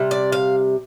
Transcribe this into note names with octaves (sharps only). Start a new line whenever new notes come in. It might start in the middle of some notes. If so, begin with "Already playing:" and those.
Already playing: C3 G3
D5
F5